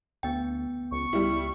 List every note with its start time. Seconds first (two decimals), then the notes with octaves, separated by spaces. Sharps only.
0.23 D2 B3 G5
0.91 C#2 C#6
1.13 C#2 G3 E4